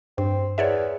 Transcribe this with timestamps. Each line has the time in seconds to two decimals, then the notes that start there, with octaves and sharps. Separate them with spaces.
0.18 G2 C4
0.58 E2 C#5 D5 E5